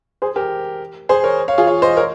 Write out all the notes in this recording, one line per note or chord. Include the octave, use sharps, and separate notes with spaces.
G#4 C5
G4 A#4
G#4 C5
A#4 C#5
C#5 F5
F4 G#4
C#5 F5
C5 D#5
A#4 C#5